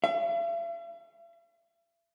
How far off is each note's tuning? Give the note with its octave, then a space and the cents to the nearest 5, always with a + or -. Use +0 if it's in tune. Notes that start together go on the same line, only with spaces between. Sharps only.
E5 +45